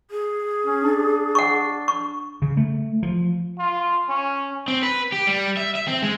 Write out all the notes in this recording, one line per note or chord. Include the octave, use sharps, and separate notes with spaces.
G#4
C#4
D4
F#5 C#6
C#6
C#3
A3
F3
F4
C#4
C4
B4
G4
G3
E5
E5
C4
G#3